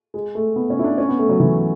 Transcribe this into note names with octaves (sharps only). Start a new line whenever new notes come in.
G#3
A3
B3
C#4
E4
D4
C#4
B3
A3
F#3
E3